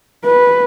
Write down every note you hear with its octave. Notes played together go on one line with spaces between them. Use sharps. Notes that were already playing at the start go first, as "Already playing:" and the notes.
B4